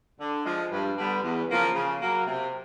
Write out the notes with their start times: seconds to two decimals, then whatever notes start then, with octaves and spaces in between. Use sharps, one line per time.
0.20 D3
0.45 F3 G#3
0.71 G2
0.97 D3 G3 B3 D4
1.23 E2
1.49 C#3 F3 A#3
1.75 C#3
2.01 F#3 A#3
2.27 C3